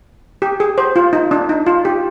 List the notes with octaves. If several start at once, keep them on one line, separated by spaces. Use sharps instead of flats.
G4
G#4
C5
F4
D#4
D4
D#4
F4
G4